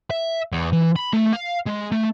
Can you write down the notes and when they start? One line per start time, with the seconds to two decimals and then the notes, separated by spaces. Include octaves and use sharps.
0.11 E5
0.53 E2
0.73 E3
0.96 B5
1.13 A3
1.33 F5
1.67 G#3
1.92 A3